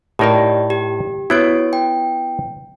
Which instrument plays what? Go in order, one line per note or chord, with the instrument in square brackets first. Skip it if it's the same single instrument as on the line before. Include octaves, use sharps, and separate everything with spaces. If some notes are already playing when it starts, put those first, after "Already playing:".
[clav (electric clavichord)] A2 D#4 A#4 [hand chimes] G4 D5 D#5
[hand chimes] G4
[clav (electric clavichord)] B3 E4 [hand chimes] F#4 C#5 D7
[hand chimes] G5